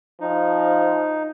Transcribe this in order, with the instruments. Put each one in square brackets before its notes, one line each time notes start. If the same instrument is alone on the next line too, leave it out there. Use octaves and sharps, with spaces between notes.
[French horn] F3 [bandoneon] D#4